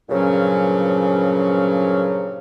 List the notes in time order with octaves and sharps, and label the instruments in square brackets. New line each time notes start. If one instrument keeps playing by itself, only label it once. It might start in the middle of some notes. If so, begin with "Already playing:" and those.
[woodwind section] G2 A#2 C#3 F3 F#3 C#4